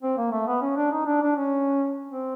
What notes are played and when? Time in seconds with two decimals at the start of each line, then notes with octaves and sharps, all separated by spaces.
0.03 C4
0.18 A#3
0.32 A3
0.47 B3
0.61 C#4
0.77 D4
0.92 D#4
1.06 D4
1.22 D4
1.36 C#4
2.11 C4